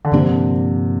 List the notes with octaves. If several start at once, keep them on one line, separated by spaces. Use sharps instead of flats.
D3
G2 C3 F3 A#3 D4